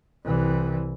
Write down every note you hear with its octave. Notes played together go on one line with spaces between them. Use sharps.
C2 E3